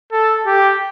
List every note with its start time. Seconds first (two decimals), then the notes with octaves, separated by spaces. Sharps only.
0.12 A4
0.47 G4